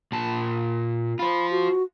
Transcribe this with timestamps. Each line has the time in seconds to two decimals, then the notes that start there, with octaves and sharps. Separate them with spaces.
0.12 A#2 A5
1.19 F4 C5 B5
1.51 F#4